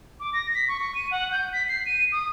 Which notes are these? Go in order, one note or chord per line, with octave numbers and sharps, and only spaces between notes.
D6
A#6
B6
C#6
C#6
D#7
F#5
G6
B6
C7
D#7
D#6